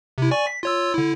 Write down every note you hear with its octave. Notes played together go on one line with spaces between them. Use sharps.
C3 E4
D5 G#5 C#6
B6
F4 C#5 E6
D3 E4